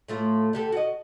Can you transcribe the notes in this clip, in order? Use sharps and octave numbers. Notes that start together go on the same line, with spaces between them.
A2 A3 F4
D3 G4 A4
F#4 D#5